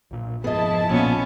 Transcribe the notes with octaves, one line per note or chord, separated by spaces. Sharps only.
B1 A#2
F1 G#2 F3 B3 E4 G#4 D#5 A5
B1 A#2 B3 C#4